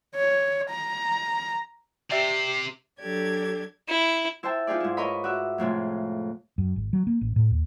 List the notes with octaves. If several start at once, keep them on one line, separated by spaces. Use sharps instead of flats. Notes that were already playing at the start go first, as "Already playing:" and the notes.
C#5
A#5
C3 G4 D5 E5 E6 C7
F#3 D4 G4 A4 D5 G#6
E4
E4 C5 E5 G5 A5
D#4 F4 G4 G#4 D5
G#2 E4
A#4 B4 C#5 D#5 B5
F#4 D5 E5
F2 A2 C3 G#3
F#2
G#1
F#3
A#3
A1
A2
D#2